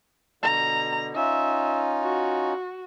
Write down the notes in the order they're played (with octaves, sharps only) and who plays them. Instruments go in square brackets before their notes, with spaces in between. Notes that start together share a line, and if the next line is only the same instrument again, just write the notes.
[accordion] B2 D3 [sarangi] A#5
[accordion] C#4 D#4 F4 [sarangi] E5
[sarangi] F#4